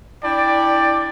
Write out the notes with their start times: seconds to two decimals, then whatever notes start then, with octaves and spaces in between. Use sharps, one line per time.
0.24 D4 E4 D5 G5